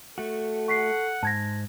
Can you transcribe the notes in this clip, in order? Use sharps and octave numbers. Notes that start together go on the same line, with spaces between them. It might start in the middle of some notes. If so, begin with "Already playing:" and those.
A3 F#4 A4
F#5 C#6 B6 C7
G#2 A5 G#6 A#6